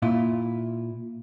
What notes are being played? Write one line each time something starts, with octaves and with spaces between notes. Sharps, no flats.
A#2 E4 F4